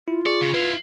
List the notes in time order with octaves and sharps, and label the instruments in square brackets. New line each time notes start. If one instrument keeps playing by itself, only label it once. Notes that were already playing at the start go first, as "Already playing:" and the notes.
[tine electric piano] E4 [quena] F4
[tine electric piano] G#4 C#6 C#7 [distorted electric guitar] D5
[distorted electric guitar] C#3
[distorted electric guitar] E4 F5 [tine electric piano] B4